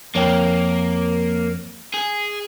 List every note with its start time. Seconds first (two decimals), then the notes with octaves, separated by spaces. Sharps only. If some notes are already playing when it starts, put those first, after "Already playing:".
0.15 F2 A#3 C#5 G5
1.94 G#4